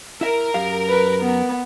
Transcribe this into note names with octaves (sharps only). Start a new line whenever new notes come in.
E4 A#4 E5
F#2 G4 F5
B4
B3